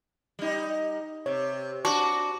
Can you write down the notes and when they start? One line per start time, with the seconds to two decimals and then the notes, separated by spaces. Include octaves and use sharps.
0.39 G3 D#4
1.26 C3 C#5
1.85 D4 F#4 C#6